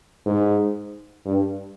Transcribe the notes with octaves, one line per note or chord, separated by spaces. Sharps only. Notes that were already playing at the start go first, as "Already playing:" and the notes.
G#2
G2